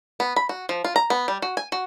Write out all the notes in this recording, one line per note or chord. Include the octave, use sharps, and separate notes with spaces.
B3
B5
F#4
F3
F4
A#5
B3
G3
F#4
G#5
F#4